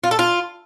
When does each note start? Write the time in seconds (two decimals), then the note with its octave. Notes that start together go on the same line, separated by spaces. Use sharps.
0.04 F4
0.11 A4
0.19 F4